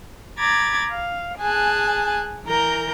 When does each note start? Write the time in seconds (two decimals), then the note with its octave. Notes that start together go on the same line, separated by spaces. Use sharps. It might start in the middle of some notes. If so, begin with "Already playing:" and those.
0.37 A#5 B5 D6 G#6 A6
0.90 F5
1.38 G#4 G#5 A5 F#6
2.45 E3 A#4 A#5 G6